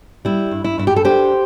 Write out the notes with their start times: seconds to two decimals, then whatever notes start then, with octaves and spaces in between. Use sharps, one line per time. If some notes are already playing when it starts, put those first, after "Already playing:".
0.25 G3 E4
0.51 G2
0.64 E4
0.78 G2 E4
0.87 G4
0.96 A4
1.04 D4 G4 C5